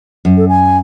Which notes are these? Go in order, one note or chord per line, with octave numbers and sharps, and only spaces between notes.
F#2
A4
G#5